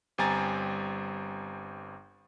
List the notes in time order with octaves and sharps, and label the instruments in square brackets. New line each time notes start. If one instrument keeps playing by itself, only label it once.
[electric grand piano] G1 G3 C4 G#5 A#5 A6